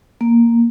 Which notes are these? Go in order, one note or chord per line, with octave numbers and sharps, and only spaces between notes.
A#3